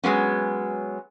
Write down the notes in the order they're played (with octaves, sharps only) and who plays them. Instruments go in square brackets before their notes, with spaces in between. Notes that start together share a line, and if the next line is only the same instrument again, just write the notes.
[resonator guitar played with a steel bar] F#3 G#3 B3 C#4